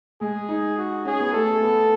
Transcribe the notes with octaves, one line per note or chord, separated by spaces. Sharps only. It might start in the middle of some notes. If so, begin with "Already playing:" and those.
G#3 G#4
D#4
F#4
C#4 G#4
B3
A3 A4
B3